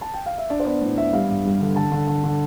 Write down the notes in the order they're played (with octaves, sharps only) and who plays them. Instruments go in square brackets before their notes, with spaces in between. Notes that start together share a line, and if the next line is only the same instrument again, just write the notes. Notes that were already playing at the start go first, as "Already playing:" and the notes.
[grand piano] A5
G5
F5
E5
D4 D5
C5
B3 D5
A2 D5
B3 E5
G3 F5
G2
G3
D3
D3 A5
D3
D3
D3